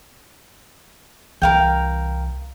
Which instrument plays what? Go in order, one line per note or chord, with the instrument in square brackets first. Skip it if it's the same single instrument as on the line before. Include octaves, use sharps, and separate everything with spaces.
[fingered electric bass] C2 E3 [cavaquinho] A#4 F5 G5